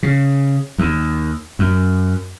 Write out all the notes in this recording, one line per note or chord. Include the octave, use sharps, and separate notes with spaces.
C#3
D#2
F#2